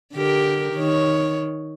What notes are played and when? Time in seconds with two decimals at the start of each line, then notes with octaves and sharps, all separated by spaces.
0.14 D3 G4 A#4
0.74 D#3 C#5